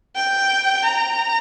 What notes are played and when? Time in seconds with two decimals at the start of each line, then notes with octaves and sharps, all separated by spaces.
0.15 G5
0.85 A#5